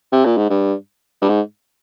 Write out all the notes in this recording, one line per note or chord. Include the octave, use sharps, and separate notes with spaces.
C3
A#2
G#2
G2
G2
G#2